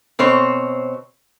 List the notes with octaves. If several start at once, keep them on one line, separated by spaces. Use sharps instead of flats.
B2 C4 C5 C#5